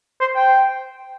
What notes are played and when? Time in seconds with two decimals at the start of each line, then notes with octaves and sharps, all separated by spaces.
0.21 C5
0.36 G5